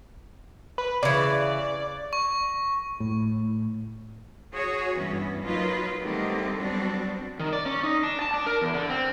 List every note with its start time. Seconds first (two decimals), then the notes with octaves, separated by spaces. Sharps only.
0.78 B4
1.03 C#3 E3 D5
2.13 C#6
3.00 A2
4.54 F#4 G#4 C#5
4.96 G2 E3 B3 C#4
5.43 F#3 A#3 D#4 F4 B4
6.01 D3 D#3 G3 A3 C4 G4
6.57 F#3 G3 B3 C4 D4 F#4
7.39 D#3
7.53 D5
7.66 C#4
7.83 D#4
8.03 D4
8.22 A5
8.34 D4
8.46 A#4
8.61 E2
8.74 D3
8.90 C4